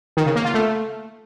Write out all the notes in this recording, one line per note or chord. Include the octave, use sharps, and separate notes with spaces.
D#3
C#3
A#3
F4
A3